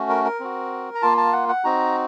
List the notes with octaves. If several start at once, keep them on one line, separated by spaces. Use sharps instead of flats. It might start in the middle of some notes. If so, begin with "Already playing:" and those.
Already playing: A3 C#4 F#4
A#4
A#4
C4 F#4
A#5
A#3 F4 A5
A5
F#5
F#5
C4 D#4 F#4 A#5